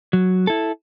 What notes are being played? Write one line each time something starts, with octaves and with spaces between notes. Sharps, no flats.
F#3
E4 A4